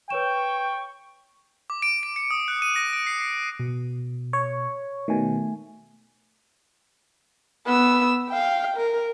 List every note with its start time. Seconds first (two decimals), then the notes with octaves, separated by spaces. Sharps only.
0.10 B4 C#5 G5 C#6 E7
1.70 D6
1.82 D7
2.03 D7
2.16 C#7
2.31 D#6
2.48 F#6
2.62 D#7
2.76 A#6
2.93 D7
3.07 C7
3.20 C7
3.60 B2
4.33 C#5
5.08 B2 D#3 A3 G#5
7.67 B3 E6
8.29 F5 G5
8.77 A#4